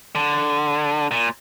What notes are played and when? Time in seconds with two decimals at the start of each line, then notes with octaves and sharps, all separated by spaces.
0.15 D3
1.11 A#2